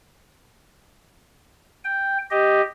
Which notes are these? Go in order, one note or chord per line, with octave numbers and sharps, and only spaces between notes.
G5
G4 D#5